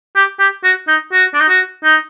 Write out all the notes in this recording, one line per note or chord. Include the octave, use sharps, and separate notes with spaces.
G4
G4
F#4
D#4
F#4
D4
D#4
F#4
D#4